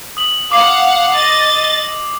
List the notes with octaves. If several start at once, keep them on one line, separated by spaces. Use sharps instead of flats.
D#6 F#7
F5 F#5 D6 C7 F#7
D#5 A6